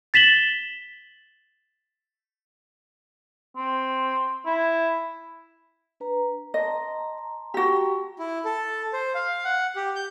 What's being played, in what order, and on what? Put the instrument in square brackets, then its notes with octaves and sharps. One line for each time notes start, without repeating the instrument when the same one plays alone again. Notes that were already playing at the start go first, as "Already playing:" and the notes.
[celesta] A6 B6 E7 F#7 G7
[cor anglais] C4
E4
[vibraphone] D4 B4 A#5
[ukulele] D#5 [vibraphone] A5 A#5 C6
[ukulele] F#4 G4
[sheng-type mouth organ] E4
A4
C5
F5
F#5
G4
G6